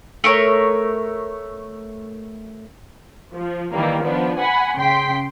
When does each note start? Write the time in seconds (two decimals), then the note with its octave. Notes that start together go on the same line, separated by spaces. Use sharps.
0.24 A3 A#4 C#5
3.33 F3
3.72 D#3 E3 G3 A#3
4.03 F3 B3 D4
4.39 F#5 G#5 B5
4.77 C#3 G5 C6 B6